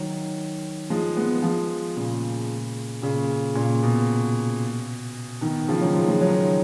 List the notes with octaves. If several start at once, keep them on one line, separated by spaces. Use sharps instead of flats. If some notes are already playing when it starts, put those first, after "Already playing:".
Already playing: D#3 F#3
F3 G#3
G#3 B3
F3 G#3
A#2 C#3
A#2 C#3
A#2 C#3
B2
B2 D#3
C#3 F3
D#3 F#3
F3 G#3
F3 G#3
D#3 F#3